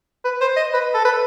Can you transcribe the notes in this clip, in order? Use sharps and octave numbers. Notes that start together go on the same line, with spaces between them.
B4
C5
D#5
B4
A4
B4